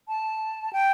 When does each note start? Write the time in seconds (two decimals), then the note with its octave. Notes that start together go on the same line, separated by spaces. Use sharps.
0.08 A5
0.73 G5